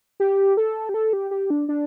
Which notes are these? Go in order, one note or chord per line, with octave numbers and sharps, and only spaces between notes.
G4
A4
G4
A4
G4
G4
D4
D4